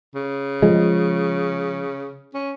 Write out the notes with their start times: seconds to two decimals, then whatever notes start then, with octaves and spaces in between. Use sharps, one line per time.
0.15 C#3
0.62 F3 G#3
2.34 C#4